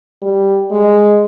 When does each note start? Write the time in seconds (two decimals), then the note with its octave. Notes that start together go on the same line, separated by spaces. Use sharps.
0.22 G3
0.71 G#3